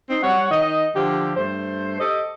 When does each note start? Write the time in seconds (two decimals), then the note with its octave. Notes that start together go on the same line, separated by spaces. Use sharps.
0.10 C4 D#4
0.23 G3 C#5 F#5
0.51 D#3 D#4 D#5
0.96 D3 F3 G4
1.37 G2 A3 C5
2.00 G4 A4 D#5